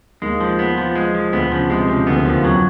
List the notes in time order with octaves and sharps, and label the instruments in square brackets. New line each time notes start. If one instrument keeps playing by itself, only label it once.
[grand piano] D#2 D#3 [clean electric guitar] G#3
[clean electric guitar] F3
B3
F3
G#3
F3
[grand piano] D2 D3 [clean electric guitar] B3
[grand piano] C#3 [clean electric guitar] F3
[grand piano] C3 [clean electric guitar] G#3
[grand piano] C#3 [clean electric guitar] F3
[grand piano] D2 D3 [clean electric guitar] B3
[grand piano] D#2 D#3 [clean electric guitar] F3
[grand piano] F2 F3 [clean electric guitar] F#3